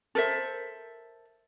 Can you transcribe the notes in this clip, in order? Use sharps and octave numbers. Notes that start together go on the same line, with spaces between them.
A4 A#4 C5 E5